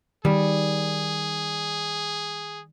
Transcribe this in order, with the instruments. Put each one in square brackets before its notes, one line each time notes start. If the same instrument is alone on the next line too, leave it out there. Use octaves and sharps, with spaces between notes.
[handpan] D#3 [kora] G3 [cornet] G#4